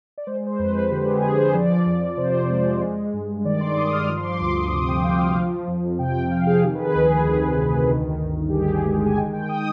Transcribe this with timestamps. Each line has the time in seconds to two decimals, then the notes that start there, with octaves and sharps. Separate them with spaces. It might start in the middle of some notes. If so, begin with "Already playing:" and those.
0.18 D5
0.27 G#3 C5
0.47 C5
0.59 F2 B4
0.91 D3 G4
1.06 G#4
1.22 F2 G#4
1.38 C5
1.54 F3 D5
1.86 F2
2.17 C3 C5
2.50 G#3
2.82 G#3
3.13 G2
3.45 D#3 D5
3.55 D6
3.61 C6
3.77 G2 D#6
3.93 F6
4.09 F3 D#6
4.17 C6
4.24 D6
4.40 D2 C6
4.57 D#6
4.72 C3 D#6
4.88 G5
5.04 D2 F5
5.20 F5
5.36 F3
5.67 F2
5.99 C3 G5
6.31 F2 F5
6.47 G#4
6.63 D#3 G4
6.75 B4
6.79 G#4
6.95 D2 G#4
7.11 G#4
7.27 C3
7.58 D2
7.90 D#3
8.22 G1
8.49 G4
8.54 G2 G#4
8.86 G#3
9.06 G#5
9.17 D#3 G5
9.33 G5
9.49 D#6